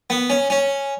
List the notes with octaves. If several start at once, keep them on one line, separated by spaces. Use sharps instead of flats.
B3
C#4
C#4